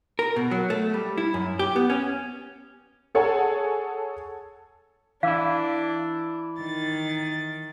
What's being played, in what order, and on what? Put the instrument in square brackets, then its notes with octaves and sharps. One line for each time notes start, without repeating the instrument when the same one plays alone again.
[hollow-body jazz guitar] A#4
B2
F#3
A3
G3
E4
F#2
G4
B3
C#4
[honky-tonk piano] G#4 A4 C#5 F#5 G#5 A5
[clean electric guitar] E3 E4 [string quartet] D4 [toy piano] F5
[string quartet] D#3 A6